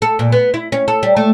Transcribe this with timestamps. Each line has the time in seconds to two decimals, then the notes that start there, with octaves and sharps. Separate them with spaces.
0.02 A4
0.19 A#2
0.32 B3
0.54 E4
0.72 C#4
0.88 A4
1.03 G3
1.16 A3